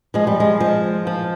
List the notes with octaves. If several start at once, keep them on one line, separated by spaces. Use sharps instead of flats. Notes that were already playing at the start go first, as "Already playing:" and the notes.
F3 G#3
G3
G#3
F3
F3